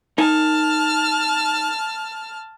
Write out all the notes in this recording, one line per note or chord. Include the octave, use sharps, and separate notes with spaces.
D#4 A#4 G#5 A5 F6